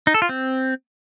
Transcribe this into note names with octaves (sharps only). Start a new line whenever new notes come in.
D#4
A4
F4
C4